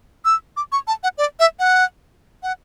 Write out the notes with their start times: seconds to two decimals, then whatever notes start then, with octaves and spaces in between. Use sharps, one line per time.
0.25 E6
0.57 D6
0.72 C#6
0.87 A5
1.03 F#5
1.18 D5
1.40 E5
1.59 F#5
2.43 F#5